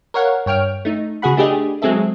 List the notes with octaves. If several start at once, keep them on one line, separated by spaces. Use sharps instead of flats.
A#4 C#5 F5 F#5
G2 C#5 G5 F6 D7
A3 D#4
C#3 F#4 G#4 F#5 B5
A3 D4 G4 G#4 D#5
F#3 G#3 C4 G#4 A4 E5